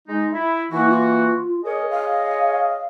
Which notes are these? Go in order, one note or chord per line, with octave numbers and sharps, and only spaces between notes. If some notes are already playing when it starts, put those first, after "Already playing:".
G#3 D#4
E4
E3 A#3 E4 F#4
F4
G#4 A#4 C#5 D#5
F5